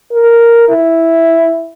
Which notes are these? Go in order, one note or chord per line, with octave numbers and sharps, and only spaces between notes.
A#4
E4